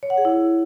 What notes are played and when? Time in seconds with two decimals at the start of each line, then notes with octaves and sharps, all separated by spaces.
0.03 C#5
0.10 F#5
0.18 G#4
0.25 E4